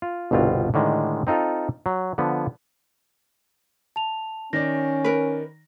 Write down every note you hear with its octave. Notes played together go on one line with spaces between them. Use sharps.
F4
G1 C2 B2 C4 F4
A2 D3 D#3 G#3
C4 D#4 F4 A4
F#3
D3 F3 B3
A5 F7
D#3 C#4 D5 A#6
A#4 B4